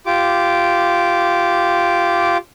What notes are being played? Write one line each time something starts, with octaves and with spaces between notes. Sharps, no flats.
F4 G4 D6